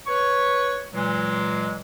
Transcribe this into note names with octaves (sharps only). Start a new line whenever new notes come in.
B4 C#5 C#6
A#2 E3 F#3 G#3